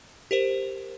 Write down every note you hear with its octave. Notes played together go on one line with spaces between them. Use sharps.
G4 A#4 C5